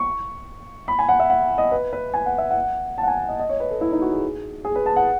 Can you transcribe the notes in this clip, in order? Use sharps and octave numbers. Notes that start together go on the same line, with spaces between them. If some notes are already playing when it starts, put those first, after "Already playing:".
Already playing: C#6
B5
G#5
F#5
E5
F#5
D#5
B4
B4
G#5
F#5
E5
F#5
A5
F#5
G#5
D#5
D#5
C#5
B4
A4
E4
D#4
F#4
G#4
G#4
B4
A5
F#5